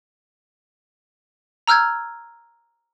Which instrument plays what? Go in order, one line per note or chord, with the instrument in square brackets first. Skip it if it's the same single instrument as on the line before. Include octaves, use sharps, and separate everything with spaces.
[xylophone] A#5 E6 F6 G6 G#6